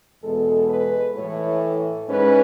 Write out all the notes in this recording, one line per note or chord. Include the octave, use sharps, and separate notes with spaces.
E2 B2 G#3 A4
B4
A2 E3 A3 C#5
G#2 G#3 C#4 B4